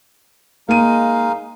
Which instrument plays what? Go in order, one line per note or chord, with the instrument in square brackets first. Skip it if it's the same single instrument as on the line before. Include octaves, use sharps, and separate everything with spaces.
[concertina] G#3 D#4 F5 [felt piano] A#3 D#7